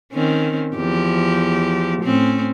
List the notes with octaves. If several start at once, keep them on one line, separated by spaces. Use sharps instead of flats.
D#3 C4 C#4
E2 F3 G4
A2 C4 C#4